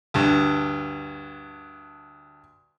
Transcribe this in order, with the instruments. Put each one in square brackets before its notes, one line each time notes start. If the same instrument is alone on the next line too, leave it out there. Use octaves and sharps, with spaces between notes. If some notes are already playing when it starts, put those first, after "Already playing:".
[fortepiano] D2 G2